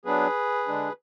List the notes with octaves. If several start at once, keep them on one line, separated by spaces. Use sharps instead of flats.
F#3 B3 D4 G#4 B4
D3 G#3 D4